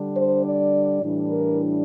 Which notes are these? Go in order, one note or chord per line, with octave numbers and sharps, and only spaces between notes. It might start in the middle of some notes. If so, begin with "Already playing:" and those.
Already playing: D3 G3 D4
C5
D5
A2 E3 G3 D4
A#4